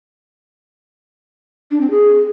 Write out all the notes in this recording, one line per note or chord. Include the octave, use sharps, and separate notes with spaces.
D4
C4
G#4